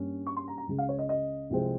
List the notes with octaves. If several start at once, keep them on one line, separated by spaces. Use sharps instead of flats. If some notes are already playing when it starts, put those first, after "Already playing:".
Already playing: G2 G3 A#3 C#4
C#6
C6
A#5
A#5
C#2 C#3 G#3
F5
C#5
D#5
D#5
C2 C3 F3 G#3 C4